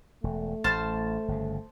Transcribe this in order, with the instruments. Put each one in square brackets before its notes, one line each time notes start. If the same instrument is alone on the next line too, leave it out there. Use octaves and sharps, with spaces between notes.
[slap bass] E1 [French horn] A3
[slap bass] A1 [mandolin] C5 A5 F6
[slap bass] G1 C#3